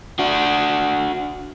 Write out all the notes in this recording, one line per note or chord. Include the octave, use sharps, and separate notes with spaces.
D4 F#4